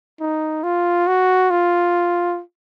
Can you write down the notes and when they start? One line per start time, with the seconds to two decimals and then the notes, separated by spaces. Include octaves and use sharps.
0.21 D#4
0.63 F4
1.08 F#4
1.51 F4